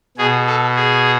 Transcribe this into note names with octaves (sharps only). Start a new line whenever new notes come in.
B2 G#4
A4
G#4